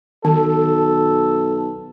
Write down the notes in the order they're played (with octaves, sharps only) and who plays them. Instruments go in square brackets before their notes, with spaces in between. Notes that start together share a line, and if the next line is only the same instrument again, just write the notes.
[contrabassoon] B1 [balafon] D#3 [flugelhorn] A4